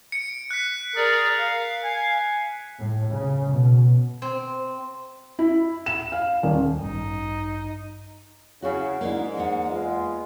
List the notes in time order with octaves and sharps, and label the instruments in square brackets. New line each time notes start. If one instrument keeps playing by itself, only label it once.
[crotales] C#7 D7
F#6 B6
[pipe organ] G#4 D5 [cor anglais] A#4
[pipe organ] F5
[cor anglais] G#5
[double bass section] A2
C#3
B2
[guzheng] C4
[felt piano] E4
E7
F5
D#1
[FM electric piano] A1 G2 [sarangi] D#4
[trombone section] C#3 [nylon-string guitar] C#4 E4 F#4
[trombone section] G#2 [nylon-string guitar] A#3 D4 E4
[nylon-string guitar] E2 A#3 F#5
[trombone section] G#3 B3 F4